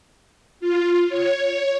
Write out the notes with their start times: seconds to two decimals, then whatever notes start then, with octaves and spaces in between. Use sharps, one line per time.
0.60 F4
1.09 C#5